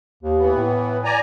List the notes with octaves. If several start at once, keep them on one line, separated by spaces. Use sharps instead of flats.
D#2
E3 B3
A2
D5 G#5 A#5